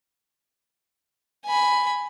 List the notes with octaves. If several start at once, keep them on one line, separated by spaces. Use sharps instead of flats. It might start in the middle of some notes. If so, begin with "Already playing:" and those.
G#5 B5